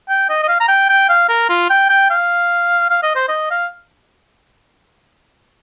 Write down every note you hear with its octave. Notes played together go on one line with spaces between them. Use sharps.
G5
D#5
D#5
F5
A#5
G5
G5
F5
A#4
F4
G5
G5
F5
F5
D#5
C5
D#5
F5